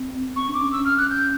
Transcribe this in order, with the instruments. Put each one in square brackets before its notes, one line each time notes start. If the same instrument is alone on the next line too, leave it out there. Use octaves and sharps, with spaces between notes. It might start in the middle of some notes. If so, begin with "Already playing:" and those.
Already playing: [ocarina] C4
[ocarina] C4 [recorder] C#6
[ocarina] D4
[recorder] D6
[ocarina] C#4
[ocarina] C#4 [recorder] E6
[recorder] F6
F#6
G6